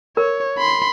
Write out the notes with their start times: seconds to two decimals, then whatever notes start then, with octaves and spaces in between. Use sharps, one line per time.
0.17 A#4 C#5
0.58 B5 C6